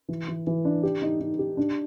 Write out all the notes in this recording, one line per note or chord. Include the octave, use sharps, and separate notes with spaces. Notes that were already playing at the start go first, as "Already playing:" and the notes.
E3
E3
E3
D4
G4
D#4
D#4
G4
D4